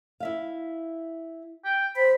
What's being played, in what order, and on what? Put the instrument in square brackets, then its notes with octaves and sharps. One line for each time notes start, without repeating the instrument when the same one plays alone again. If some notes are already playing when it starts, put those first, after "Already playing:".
[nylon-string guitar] E4 E5 F5
[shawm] G5
[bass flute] C5 [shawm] B5